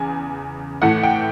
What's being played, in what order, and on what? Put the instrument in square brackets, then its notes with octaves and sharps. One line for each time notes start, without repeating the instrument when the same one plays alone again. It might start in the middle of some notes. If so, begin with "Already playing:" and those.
Already playing: [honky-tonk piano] E2 C#3 G#5
A2 E3 A3 F#5
G5